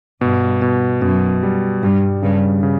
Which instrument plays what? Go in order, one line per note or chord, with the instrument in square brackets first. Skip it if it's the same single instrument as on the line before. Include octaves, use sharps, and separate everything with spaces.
[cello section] G2 [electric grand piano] B2
[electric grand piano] B2
[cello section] F#2 [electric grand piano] B2
[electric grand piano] G3
[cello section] G2 [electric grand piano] G3
[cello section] G2 [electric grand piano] C#3
[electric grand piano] C#3